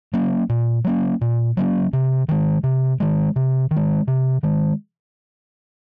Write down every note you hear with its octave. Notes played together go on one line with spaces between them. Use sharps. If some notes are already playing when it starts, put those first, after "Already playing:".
F#3 A#3 C#4
A#2
F#3 A#3 C#4
A#2
F#3 A#3 C#4
C3
D#3 G#3
C3
D#3 G#3
C3
D#3
G#3
C3
D#3 G#3